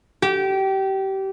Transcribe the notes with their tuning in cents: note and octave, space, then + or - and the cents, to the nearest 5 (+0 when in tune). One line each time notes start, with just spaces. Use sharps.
G4 -25